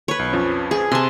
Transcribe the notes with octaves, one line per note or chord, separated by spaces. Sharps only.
B4 C#5
B1
F2 F3 C#4
G#4
C3 A5 C6